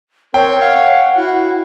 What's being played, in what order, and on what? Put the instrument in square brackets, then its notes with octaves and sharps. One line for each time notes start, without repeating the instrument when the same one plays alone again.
[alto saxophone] C4 [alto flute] A#4 [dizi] C#5 [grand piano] G5
[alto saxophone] F5 [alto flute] F#5
[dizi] E4 [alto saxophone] F#4